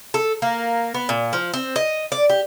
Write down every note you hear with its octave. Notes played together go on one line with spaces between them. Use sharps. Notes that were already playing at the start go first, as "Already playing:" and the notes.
A4
A#3
B3
A#2
F3
C4
D#5
D5
G4